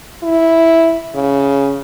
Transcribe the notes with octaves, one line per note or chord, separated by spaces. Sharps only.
E4
C#3